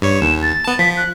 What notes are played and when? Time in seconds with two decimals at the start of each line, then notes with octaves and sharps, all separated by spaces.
0.02 G2 C#5
0.21 D#2 E7
0.42 A6
0.64 B3 A5
0.79 F3 B6
0.97 F#6